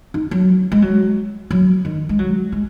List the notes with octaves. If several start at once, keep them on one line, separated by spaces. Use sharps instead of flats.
D#4
F#3
G#3
F#3
F#3
D#3
G#3
F#3
G#3